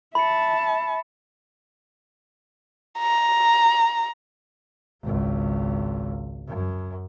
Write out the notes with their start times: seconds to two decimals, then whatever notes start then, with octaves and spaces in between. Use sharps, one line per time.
0.15 E5 A5 B5 C#7
2.99 A#5
5.03 G#1 C#2
6.48 F#2